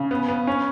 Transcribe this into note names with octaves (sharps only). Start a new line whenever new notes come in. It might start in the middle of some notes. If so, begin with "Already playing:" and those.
Already playing: C#3
B3
B3
C#4